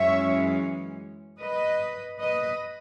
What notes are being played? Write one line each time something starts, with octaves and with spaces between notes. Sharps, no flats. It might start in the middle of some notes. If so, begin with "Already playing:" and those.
Already playing: F#2 E3 G#3 C#4 C#5 E5
B4 D#5
B4 D#5